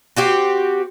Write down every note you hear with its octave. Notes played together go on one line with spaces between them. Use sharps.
C4 F#4 G4